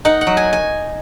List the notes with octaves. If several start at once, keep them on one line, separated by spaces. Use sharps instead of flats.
D#4 F#5
F#5
F#3
G#5
G#5